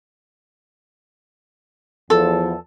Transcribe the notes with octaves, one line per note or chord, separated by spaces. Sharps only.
E2 F3 A4